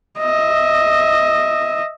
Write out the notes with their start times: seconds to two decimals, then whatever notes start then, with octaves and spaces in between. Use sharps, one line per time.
0.18 D#5 E5